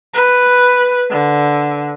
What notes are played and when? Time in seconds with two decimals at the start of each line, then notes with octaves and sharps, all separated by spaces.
0.13 B4
1.10 D3